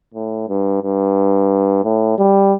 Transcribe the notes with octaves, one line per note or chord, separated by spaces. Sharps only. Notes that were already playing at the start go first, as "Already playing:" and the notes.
A2
G2
G2
A2
G3